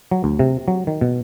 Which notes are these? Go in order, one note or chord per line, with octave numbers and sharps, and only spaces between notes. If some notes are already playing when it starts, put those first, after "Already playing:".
F#3
D2
C3
F#3
D#3
B2